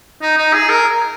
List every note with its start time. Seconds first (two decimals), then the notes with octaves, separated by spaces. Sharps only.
0.22 D#4
0.38 D#4
0.54 G#4
0.69 A#4